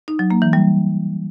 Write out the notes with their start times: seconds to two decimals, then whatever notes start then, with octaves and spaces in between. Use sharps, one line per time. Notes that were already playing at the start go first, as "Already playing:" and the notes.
0.08 D#4
0.19 F#3
0.31 A#3
0.42 E3
0.53 G3